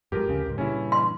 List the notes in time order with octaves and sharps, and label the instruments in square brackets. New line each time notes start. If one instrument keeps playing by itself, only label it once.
[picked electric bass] G2 F3 G#3 [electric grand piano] G4 A#4
[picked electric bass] D2 C#3
C#2 G#2
[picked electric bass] G2 A#2 C#3 [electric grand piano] C#4 E4
[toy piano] C6